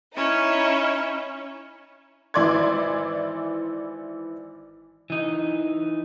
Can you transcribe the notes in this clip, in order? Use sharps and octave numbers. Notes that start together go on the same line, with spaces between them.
C#4 D#4 E4
G#1 E3 E4 D5 C6 G#6
E3 D#4